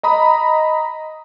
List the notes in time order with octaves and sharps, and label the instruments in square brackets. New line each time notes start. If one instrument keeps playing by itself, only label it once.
[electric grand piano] D#5 A#5 B5 D#6